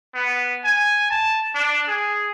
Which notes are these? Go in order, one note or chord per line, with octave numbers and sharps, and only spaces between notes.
B3
G#5
A5
D4
G#4